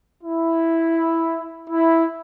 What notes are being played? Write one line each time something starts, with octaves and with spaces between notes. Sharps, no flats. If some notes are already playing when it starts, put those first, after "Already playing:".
E4
E4